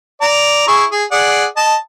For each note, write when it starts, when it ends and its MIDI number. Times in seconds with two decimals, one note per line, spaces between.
0.22 0.66 74
0.22 0.66 82
0.68 0.84 64
0.68 0.84 68
0.68 0.84 85
0.92 1.04 68
1.12 1.45 68
1.12 1.45 74
1.12 1.45 78
1.57 1.75 75
1.57 1.75 81